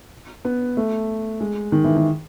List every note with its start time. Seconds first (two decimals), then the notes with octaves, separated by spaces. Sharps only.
0.45 B3
0.77 A3
1.40 G#3
1.72 D#3
1.84 E3
1.97 D#3